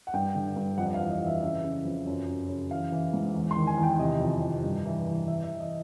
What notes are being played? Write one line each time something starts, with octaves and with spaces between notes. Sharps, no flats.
F#5
G2 G5
D3
G2
F2 F#5
F5
E3
D#5
E3
E5
C#3 E5
C#3
F2
F#2
F#2
C#3
E3 F5
E3
G#2
E2
C6
D#3
G#5
E2
G5
C3 D#5
F2
C3
G2
E3
E3
E3 E5
E5
E3
D#5